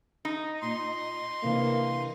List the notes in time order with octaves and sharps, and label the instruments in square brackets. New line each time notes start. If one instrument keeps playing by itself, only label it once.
[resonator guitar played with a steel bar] D#4
[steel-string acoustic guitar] A#2 [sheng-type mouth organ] C6
[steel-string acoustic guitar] C3 E3 D4 [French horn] A#3